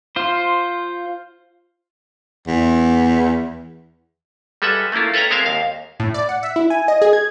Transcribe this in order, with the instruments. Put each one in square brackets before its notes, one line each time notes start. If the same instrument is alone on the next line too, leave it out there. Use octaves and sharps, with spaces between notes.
[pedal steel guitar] F4 C5
[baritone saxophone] E2
[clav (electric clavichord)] G3 G#3 A4 B4 E5 F#5
A3 A#3 C#4 E4 F4
A4 B4 C#5 G5 A#5
G#3 C4 A#4 C#5 E5 F5
D#2 F5
[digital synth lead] A2
D5
F#5
E5
E4
G#5
D#5
G#4
G#6